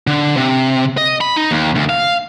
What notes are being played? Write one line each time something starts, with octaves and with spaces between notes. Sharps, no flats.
D3
C3
D#5
B5
D#4
D#2
D2
F5